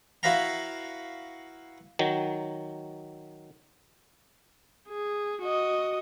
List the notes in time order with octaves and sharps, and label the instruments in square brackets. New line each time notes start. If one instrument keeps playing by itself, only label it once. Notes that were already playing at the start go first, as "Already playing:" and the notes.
[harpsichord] E4 F#4 B4 E5 F5 A#5
[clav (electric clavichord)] D#3 F#3
[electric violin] G#4
F#4 D#5